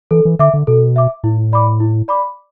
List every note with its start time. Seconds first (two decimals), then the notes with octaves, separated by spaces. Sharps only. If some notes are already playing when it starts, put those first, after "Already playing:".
0.11 E3 A4
0.25 E3
0.39 D3 E5 D6
0.54 D3
0.67 B2 A4
0.96 E5 D6
1.23 A2 E4
1.53 D5 B5 D6
1.80 E4
2.08 D5 B5 D6